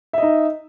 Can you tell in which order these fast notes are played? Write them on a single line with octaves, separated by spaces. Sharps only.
E5 D#5 D#4